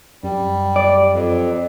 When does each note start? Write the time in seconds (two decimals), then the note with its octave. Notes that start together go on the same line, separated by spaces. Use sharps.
0.23 F#2 G3
0.76 D5
1.13 F2